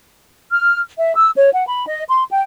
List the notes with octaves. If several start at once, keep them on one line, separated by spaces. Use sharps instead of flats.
F6
E5
E6
C#5
F#5
B5
D#5
C6
G5